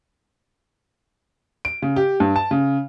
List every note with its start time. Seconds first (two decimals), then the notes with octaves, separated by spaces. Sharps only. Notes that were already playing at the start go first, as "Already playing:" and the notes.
1.65 D7
1.82 C#3
1.96 G4
2.20 G2
2.36 A5
2.51 C#3